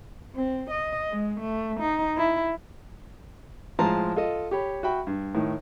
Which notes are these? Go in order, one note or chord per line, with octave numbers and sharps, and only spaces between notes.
C4
D#5
G#3
A3
D#4
E4
A2 F3 G#3 A5 A#5 C6
F4 A4 D#5
G4 C#5 B5
F#4 E5 G5 B5
G2
A2 D#3